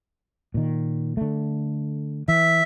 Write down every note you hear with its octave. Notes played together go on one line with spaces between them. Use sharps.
A#2 D#3
D3 A3
E3 E5